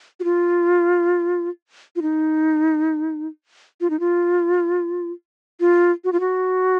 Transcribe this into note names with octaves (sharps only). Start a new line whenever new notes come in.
F#4
F4
F4
D#4
F4
D#4
F4
F4
F#4
F4
F#4